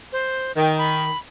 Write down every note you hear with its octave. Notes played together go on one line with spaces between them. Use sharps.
C5
D#3 G5
B5